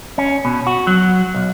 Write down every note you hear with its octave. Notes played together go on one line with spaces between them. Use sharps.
C#4
B2
F#4
F#3
B1